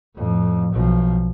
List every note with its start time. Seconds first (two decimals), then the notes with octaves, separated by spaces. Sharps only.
0.15 F2 A2
0.73 B1 F3